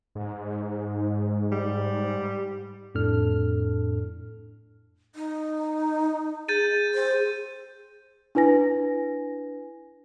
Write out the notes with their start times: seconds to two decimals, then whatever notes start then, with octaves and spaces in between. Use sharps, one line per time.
0.15 G#2
1.52 G3
2.95 F2 A2 D4 A4 F6
5.15 D#4
6.49 G#4 G6 A6 D#7
6.95 C5
8.35 D4 E4 B4 G#5 A#6